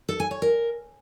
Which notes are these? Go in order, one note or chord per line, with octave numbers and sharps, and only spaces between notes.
A4
G#5
C#5
A#4